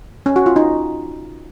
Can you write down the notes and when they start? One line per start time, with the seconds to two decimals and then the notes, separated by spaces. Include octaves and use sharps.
0.26 C#4
0.36 F#4
0.46 F4
0.56 D#4